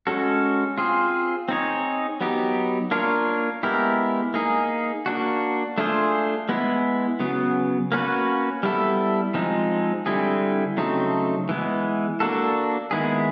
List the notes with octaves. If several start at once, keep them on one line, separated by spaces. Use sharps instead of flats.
G#3 C#4 F#4 A4
C4 F4 G#4
C4 D#4 G#4 C#5
F#3 B3 D#4 G4
A#3 D4 F4 A#4 C#5
G#3 B3 E4 G4 A#4
A#3 D#4 G#4
A#3 D4 F#4
A3 D4 F4 G#4 C5
G#3 B3 E4
C#3 F#3 B3
A#3 C#4 F#4 B4
G3 B3 E4 A4
F3 G#3 C4 D#4
D3 G3 C4 E4 G#4
C#3 F#3 A3 C4 D#4
E3 G#3 B3
A#3 D4 F#4 A4
D#3 G#3 B3 E4 G#4